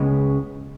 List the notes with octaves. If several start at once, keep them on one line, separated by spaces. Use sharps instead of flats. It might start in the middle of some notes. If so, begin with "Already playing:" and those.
Already playing: C#2 C#3 G#3 B3